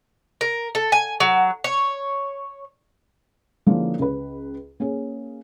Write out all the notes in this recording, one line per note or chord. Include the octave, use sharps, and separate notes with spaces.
A#4
A4
G#5
F#3
C#5
D3 F3 G#3 A#3 C#4 E4
C#2 B4
A#3 C#4 G#4